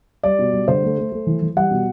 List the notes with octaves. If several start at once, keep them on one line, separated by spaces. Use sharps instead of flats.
G3 D5
B2
G3
D3 C5
A3
A3
A3
E3
E3
G3 F#5
B2